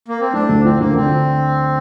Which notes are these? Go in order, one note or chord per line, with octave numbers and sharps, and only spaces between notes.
A#3
C4
A3 D4
D2
F3 C4
D2 A#3
D3 C4